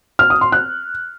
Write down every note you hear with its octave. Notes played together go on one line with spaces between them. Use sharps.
F6
D#6
C6
F#6